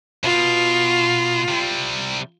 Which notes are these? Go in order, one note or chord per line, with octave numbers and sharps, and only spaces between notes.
B2 F4
C3 G3